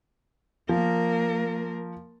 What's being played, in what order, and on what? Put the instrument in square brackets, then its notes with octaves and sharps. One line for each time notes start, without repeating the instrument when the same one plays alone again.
[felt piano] F3 [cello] A#3 A#4